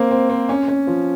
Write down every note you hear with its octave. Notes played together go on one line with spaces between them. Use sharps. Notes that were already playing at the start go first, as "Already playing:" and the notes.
Already playing: A#3 C4
C4
C4
C#4
C#4
F3